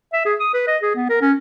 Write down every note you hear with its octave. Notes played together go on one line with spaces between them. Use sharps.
E5
G#4
D#6
B4
D#5
G#4
B3
A#4
C#4